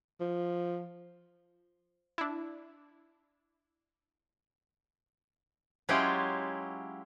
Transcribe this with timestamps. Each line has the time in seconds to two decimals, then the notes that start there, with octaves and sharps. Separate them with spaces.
0.21 F3
2.18 D4 E4
5.89 F#3 G#3 C#4 E4 F4 G4